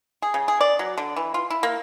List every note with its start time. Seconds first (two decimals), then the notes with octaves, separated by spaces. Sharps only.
0.22 G#4
0.34 C#3
0.48 G#4
0.61 D5
0.79 F#3
0.98 D3
1.16 E3
1.34 F4
1.50 E4
1.63 A#3